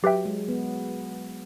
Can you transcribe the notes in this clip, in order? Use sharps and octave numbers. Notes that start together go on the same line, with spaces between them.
F#3 G4 B4 E5 G5
G#3
B3